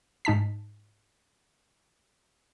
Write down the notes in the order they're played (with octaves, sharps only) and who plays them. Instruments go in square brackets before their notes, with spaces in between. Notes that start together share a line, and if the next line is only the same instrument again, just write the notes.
[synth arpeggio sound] G#2 D#4 A5 B6